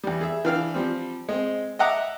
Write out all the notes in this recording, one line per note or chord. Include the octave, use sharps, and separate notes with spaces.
E2 G3
G#4 E5
E3 D4 F5 G5 F6
F3 G3 C4
G#3 C4
D#5 E5 F#5 A#5 D6